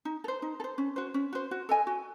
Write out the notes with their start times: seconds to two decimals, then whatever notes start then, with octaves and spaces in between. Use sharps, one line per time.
0.05 D#4
0.24 A4
0.28 C5
0.42 D#4
0.60 A4
0.64 C5
0.78 C#4
0.96 F#4 C5
1.14 C#4
1.33 F#4 C5
1.51 F#4
1.69 A4 D#5 G#5
1.87 F#4